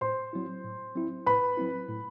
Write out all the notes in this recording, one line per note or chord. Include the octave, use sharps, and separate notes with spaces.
A2 C5 C6
F#3 C4 E4
A2
F#3 C4 E4
A2 B4 B5
F#3 C4 E4
A2